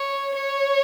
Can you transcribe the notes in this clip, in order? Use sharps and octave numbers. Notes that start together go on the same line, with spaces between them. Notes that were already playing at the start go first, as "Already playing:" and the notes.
Already playing: C#5
C#5